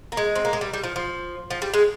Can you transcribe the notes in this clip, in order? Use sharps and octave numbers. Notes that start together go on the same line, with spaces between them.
A#3
G#3
C4
A#3
G#3
G3
G3
F3
F3
F3
G3
G#3